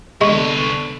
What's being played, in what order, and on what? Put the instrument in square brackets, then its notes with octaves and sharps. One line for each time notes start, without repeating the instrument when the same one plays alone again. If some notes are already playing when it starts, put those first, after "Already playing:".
[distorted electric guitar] C2 B4 [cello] D3 B3 [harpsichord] G#3 [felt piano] C#6